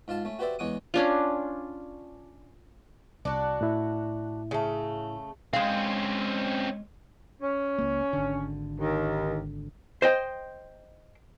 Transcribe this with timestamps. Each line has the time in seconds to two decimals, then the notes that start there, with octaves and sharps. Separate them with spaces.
0.08 G#2 F4 F5 A5
0.25 A3 C#4
0.39 F#4 G4 B4 C5 D5 E5
0.59 E2 G#3 C#5 F#5 D6 D#6
0.94 C#4 D4 F4
3.25 C2 D4 F#4
3.61 A2 E4
4.51 C#3 A3
5.53 G#3 C4 C#4 F5
7.41 C#4
7.78 C#2 A#3
8.13 G#1 D3
8.80 D#2 D#3
10.02 C5 D#5 G5